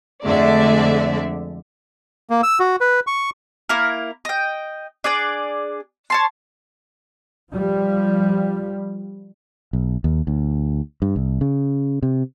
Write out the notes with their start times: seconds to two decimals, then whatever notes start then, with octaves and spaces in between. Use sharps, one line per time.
0.25 F2 D3 G#3 A3 D5 E5
2.30 A#3
2.43 E6
2.60 F#4
2.81 B4
3.07 C#6
3.69 A#3 E4 A#4
4.25 D#5 G5
5.04 D4 G#4 D5
6.10 C#5 A5 C6
7.53 F3 G3
9.73 B1
10.04 D#2
10.27 D2
11.02 G2
11.16 C2
11.41 C#3
12.02 C3